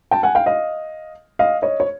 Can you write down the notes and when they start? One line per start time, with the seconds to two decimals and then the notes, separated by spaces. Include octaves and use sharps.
0.11 G5 A5
0.23 F#5 G#5
0.35 F5 G5
0.46 D#5 F5
1.39 D#5 F5
1.62 C#5 D#5
1.80 C#5